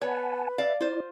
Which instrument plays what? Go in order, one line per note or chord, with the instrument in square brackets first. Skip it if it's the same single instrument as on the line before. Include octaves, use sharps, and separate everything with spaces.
[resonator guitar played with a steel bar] B3 C#5 [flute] B4 [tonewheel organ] F#5 G#5 A5
[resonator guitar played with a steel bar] D5 F5 A5 [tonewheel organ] E5
[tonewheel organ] E4 D5 [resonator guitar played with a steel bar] F4 C5